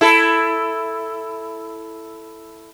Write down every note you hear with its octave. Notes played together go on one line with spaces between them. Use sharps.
E4 A4